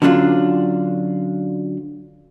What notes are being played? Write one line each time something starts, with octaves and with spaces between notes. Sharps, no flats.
D3 F#3 C#4 D4 F4